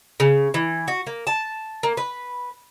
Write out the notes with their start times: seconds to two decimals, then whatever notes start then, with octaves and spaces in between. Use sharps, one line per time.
0.20 C#3
0.54 E3
0.88 F#4
1.07 A#3
1.27 A5
1.83 A#3
1.97 B4